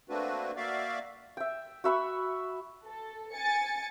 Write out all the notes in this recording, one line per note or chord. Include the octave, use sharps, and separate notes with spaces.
A3 A#3 C4 D4 F#4 B4
A#3 F#4 D5 E5 F5
E5 G5
F#4 E5 B5 C#6
A4
G#5 A6 C#7